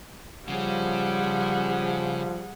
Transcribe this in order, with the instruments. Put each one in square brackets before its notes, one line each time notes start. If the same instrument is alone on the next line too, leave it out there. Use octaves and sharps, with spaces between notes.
[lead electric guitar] C#3 C#4 [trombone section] F3 [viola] G3 [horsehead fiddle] G#4 F#5